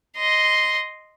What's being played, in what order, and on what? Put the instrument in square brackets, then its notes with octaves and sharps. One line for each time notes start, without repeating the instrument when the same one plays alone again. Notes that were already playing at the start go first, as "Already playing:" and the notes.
[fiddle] D#5 C6